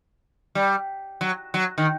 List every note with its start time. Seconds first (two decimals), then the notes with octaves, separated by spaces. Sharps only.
0.55 G3
1.21 F#3
1.54 F#3
1.78 D#3